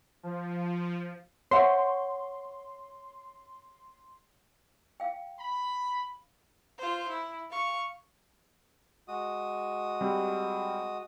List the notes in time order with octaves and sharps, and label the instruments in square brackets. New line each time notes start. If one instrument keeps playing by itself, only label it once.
[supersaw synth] F3
[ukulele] C5 E5 F#5 [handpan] C#5 [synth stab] C6
[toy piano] F5 G5
[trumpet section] B5
[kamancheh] F4 C5
E4
F5 C#6
[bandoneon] G#3 F#4 D#6
[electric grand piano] G3 C4